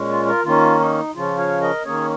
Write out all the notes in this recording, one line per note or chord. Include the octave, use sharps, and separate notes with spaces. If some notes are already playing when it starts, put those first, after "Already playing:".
Already playing: A#2 G#3 C#4
F4
F4 A#4
D#3 A#3 C#4 F4
D#4
C#3 F3 C#4 F4
C#5 F5
A#4 D#5
D#3 A#3 C#4 G#4 C#5